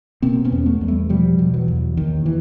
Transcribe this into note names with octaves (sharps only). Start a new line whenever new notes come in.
B2 A#3 C4
B3 C#4
E2
A3 B3
E2
G3 A3
B2 F3 G3
B2
E3 F#3
E2
D#2 D#3
E3